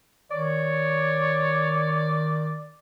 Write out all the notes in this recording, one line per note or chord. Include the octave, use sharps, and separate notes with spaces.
D#3 C#5 D5